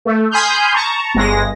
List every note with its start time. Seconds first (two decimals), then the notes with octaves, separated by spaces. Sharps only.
0.05 A3
0.31 G#5 B5 C6 D#6 F6 G6
0.74 A5 A#5 C#6
1.15 G1 G#3 A#6